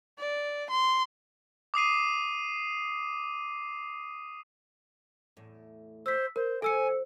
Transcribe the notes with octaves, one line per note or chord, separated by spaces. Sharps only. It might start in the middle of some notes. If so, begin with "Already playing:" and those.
D5
C6
D6 D#6 C7 D#7
E2 A2
C5 E6 B6
A#4 C5
F3 A4 G#5 E6 C#7